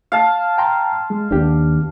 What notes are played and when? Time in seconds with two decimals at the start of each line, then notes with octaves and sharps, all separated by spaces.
0.12 F5 A5
0.58 G5 A#5 C6
1.10 G#3
1.31 D#2 D#3 B3 D4 G4